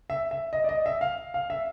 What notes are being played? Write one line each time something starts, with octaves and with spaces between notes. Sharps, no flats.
E5
E5
D#5
D5
D#5
E5
F5
F5
E5